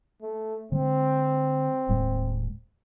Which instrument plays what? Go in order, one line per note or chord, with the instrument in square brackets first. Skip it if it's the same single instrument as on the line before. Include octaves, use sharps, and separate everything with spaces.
[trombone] A3
[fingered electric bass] D3 G#3 [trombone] C4
[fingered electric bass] D#1 A2 G#3